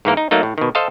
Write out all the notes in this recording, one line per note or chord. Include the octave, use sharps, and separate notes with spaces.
G#2 E3 A#3 A#4
D#4
F#3 A3 A#3 D#4
A2
B2 D#3
A4 C5 D#5 F5 A5